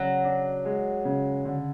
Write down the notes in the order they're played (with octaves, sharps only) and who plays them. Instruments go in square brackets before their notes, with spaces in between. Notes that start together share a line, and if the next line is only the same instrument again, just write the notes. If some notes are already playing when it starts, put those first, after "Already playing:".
Already playing: [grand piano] C#3 [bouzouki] F#3
[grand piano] D4
G#3
C#3
D3